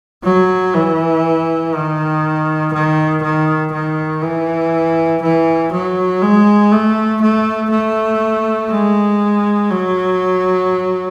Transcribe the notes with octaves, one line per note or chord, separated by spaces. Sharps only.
F#3
E3
D#3
D#3
D#3
D#3
E3
E3
F#3
G#3
A3
A3
A3
G#3
F#3